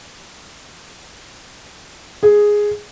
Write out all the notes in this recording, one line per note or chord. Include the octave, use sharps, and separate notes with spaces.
G#4